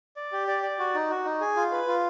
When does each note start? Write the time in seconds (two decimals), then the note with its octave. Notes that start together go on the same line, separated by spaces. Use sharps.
0.16 D5
0.33 G4
0.47 D5
0.63 D5
0.79 F#4
0.94 D#4
1.10 F#4
1.25 D#4
1.41 G#4
1.56 F4
1.72 B4
1.87 F4